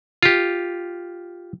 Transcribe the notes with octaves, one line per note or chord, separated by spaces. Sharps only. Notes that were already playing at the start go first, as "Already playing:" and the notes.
F4 G4